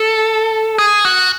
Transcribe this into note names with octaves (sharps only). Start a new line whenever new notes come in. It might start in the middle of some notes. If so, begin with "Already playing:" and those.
Already playing: A4
G#4
F#4